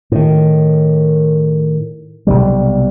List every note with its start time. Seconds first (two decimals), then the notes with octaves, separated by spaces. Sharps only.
0.12 A2 D#3
2.27 B1 C3 G3